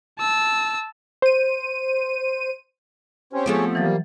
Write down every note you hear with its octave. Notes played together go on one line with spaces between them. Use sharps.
A5 E6
C5 D#7
C4 C#4 G4 C5 C#5
F3 A3 B3 C4 G4 G#4 C#5
E3 F#3 G3 A#3 A6